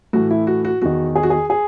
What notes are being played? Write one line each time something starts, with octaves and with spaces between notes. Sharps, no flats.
A2 E3 F#4
E4
F#4
F#4
E2 D#3 F#4
G#4
F#4
G#4
G#4